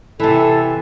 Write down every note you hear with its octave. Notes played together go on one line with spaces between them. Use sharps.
C3 E3 A4